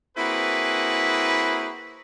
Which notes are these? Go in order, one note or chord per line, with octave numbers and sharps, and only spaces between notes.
A#3 C4 E4 F#4 G#4 B4